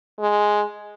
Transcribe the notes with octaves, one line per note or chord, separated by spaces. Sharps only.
G#3